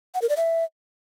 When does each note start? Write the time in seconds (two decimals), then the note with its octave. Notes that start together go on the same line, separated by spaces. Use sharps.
0.14 F#5
0.22 A#4
0.29 D5
0.37 E5